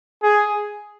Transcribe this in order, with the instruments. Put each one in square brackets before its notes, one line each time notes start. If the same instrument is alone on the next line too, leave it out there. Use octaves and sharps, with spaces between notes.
[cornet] G#4